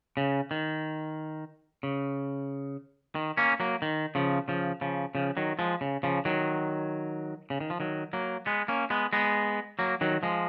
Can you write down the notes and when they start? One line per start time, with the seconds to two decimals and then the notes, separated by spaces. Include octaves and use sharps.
0.17 C#3
0.51 D#3
1.83 C#3
3.15 D#3
3.37 A#3 C#4
3.60 F#3 A#3
3.82 D#3
4.15 C#3 F3
4.48 C#3 F3
4.81 C#3 F3
5.15 C#3 F3
5.37 D#3 F#3
5.59 F3 G#3
5.81 C#3
6.03 C#3 F3
6.25 D#3 F#3
7.50 C#3
7.61 D#3
7.70 F3
7.80 D#3 F#3
8.13 F#3 A#3
8.46 G#3 B3
8.68 A#3 C#4
8.90 G#3 B3
9.13 G#3 B3
9.79 F#3 A#3
10.01 D#3 F#3
10.23 F3 G#3